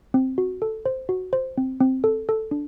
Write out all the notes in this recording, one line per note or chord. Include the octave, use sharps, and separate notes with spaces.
C4
F#4
A4
C5
F#4
C5
C4
C4
A4
A4
D4